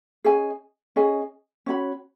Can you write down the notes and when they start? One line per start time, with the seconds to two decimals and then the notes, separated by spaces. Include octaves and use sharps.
0.24 C#4 G#4 D#5 G#5
0.96 C#4 G#4 D#5 G#5
1.66 C#4 F#4 C#5 B5